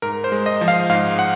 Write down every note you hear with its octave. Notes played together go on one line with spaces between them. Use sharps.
G#2 A#4
C5
G#3
D#5
F3
F5
G#2 F5
F#5